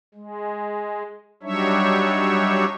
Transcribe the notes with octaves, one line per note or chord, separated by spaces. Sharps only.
G#3
F#3 G3 D4 D#4 C#5 E5